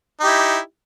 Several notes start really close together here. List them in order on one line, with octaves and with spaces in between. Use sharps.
D#4 G4 E4